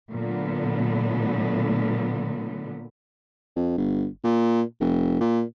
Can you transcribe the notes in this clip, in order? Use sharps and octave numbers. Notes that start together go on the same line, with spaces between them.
A#2 D3 F#3 A3 B3
F2
G1
A#2
F1
A#2